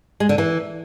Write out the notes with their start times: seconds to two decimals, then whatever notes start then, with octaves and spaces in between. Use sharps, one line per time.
0.20 G#3
0.29 D3
0.38 E3